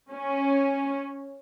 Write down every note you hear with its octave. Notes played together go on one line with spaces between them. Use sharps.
C#4